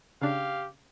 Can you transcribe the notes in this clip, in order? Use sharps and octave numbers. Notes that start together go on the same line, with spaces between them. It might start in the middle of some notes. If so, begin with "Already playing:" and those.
C#3 D4 G4 F5